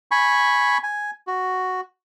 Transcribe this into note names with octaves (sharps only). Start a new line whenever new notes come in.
G#5 B5 C#6
G#5
F#4